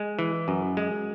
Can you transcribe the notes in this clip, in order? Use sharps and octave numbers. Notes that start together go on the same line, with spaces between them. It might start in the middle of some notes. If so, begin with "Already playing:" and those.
Already playing: G#3
E3
F#2
G#3